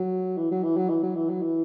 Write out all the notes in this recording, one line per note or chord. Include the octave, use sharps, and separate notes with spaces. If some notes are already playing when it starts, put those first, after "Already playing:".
Already playing: F#3
E3
F#3
E3
F#3
E3
F#3
E3
F#3
E3